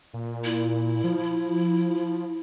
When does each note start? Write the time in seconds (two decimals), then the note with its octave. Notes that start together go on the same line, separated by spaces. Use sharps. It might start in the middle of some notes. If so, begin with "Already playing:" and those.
0.14 A#2
0.44 E4
1.04 F3